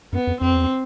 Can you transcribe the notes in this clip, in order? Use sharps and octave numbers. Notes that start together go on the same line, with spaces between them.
F#2 B3
F2
F2 C4
E2